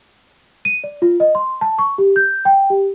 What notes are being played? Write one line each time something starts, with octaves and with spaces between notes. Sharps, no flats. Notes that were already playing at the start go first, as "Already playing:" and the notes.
D#7
D5
F4
D#5
C6
A5
C#6
G4
G6
G5
G4